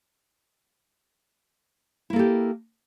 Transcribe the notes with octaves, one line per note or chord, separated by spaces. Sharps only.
A#3 E4 G4 A4